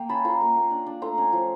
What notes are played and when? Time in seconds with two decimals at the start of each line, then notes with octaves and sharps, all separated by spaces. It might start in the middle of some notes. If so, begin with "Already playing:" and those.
Already playing: A#3 F5 G5
0.09 C#4 A5 B5
0.25 F4 A#5 C6
0.41 A#3
0.56 A#3
0.71 D4
0.86 D4
1.02 A3 A#5 C6
1.18 C#4
1.33 F3